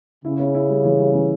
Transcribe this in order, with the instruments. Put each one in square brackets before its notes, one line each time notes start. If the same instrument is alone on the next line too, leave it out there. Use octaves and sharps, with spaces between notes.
[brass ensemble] C#3 [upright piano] E4
[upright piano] C#4
E4
G3
E3
G3
E3